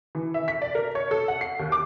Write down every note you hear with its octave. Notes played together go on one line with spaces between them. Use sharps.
E3
E5
B6
D5
A#4
C#5
A4
F#5
C7
D#2
D6